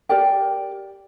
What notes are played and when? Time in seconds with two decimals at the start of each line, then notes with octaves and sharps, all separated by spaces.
0.09 G4 A#4 D5 G5